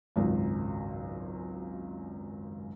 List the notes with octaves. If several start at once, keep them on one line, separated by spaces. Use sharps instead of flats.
G#1 C#2 F#2